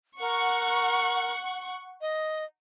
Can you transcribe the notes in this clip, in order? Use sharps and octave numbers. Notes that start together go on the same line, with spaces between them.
A#4 F#5 C#6
D#5